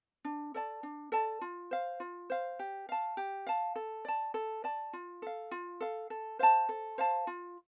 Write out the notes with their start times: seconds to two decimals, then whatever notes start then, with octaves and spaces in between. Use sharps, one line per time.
0.25 D4
0.54 A4 D5 A5
0.83 D4
1.12 A4 D5 A5
1.41 F4
1.71 C5 F5
2.00 F4
2.30 C5 F5
2.59 G4
2.89 F5 A5
3.17 G4
3.47 F5 A5
3.76 A4
4.05 D5 A5
4.34 A4
4.64 D5 A5
4.93 F4
5.22 A4 F5
5.51 F4
5.81 A4 F5
6.10 A4
6.39 C5 F5 A5
6.69 A4
6.98 C5 F5 A5
7.27 F4